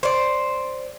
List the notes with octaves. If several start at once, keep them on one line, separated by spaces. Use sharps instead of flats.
C5 D5